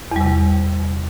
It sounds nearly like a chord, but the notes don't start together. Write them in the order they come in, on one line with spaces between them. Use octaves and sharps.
E2 G3 C3